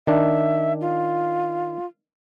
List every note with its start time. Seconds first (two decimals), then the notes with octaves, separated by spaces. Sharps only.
0.07 D#3 D4 E5
0.81 F4